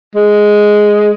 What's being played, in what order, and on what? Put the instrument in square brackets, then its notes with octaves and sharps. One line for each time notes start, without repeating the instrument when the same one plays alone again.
[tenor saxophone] G#3